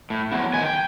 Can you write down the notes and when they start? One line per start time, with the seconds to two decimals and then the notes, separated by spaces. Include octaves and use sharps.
0.10 A2
0.31 F#3 B3 E4
0.54 D#3 G#5
0.66 G5